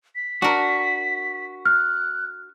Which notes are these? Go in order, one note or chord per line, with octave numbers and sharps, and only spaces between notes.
B6
D4 F#4 A#4
F6 F#6